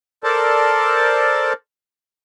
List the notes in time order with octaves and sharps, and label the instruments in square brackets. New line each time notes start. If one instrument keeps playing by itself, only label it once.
[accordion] A4 A#4 C5 D5 A5